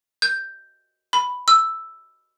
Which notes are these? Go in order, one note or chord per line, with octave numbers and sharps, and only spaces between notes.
G6
B5
E6